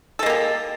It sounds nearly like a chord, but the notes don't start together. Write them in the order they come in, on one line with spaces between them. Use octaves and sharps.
A4 G#3 A#3 G4